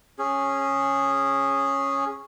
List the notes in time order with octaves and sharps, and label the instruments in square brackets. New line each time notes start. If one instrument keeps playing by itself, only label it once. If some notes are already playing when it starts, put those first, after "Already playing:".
[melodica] C#4 G#4